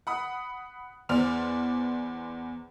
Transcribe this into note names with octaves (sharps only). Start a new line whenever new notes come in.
F#5 B5 D#6
E2 C5 D5 F6 F7